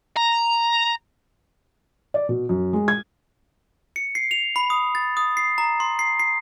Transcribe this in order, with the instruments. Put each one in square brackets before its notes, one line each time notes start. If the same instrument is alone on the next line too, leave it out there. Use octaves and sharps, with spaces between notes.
[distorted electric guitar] A#5
[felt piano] D5
B2
F#2
G#3
G#6
[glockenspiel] C#7
C7
F7
B5
D#6
A6
D#6
C7
A#5
C6
C7
C7